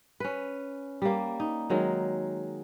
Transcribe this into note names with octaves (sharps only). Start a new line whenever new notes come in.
C#4 B4
G3 A#3
D#4
D#3 F#3 G#3